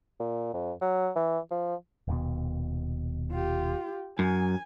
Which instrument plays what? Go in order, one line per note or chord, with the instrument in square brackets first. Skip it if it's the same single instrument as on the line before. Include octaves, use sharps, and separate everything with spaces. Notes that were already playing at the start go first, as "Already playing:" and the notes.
[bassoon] A#2
F2
F#3
E3
F3
[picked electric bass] D#1 D#2 B2
[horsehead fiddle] F4 G4
[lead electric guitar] F#2 [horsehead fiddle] G#5